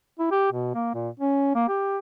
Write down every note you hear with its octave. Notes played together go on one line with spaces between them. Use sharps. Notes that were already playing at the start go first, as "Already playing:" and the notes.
E4
G4
B2
A#3
A#2
C#4
A#3
G4